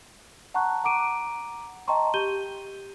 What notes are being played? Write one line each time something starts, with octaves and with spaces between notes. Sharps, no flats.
F#5 A5 A#5 C#6 F#6
F#5 A#5 D6 D7 D#7
D#5 G5 A5 A#5 C6 C#6
G4 G6 D#7 G7